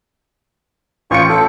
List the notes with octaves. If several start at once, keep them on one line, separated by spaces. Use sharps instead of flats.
A1 F4 C#6 C#7
A4